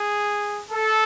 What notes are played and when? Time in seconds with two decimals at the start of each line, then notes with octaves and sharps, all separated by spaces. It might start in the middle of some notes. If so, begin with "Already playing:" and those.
Already playing: G#4
0.71 A4